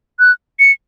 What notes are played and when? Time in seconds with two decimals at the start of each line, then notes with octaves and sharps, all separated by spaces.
0.19 F#6
0.59 C#7